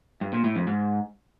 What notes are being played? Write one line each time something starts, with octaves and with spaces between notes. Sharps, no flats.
G2
A#2
A2
F2
G#2